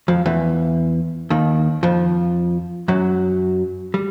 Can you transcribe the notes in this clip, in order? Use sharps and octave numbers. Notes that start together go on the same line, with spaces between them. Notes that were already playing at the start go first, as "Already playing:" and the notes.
F2 F3
E2 E3
D#2 D#3
F2 F3
F#2 F#3
G3